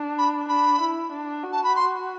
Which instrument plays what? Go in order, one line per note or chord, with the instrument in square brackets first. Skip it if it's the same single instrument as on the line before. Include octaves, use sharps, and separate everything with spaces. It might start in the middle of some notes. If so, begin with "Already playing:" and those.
Already playing: [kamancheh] D4
[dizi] B5
[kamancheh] D4 [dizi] B5
[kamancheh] E4
D4
F#4
[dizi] A5
B5
C6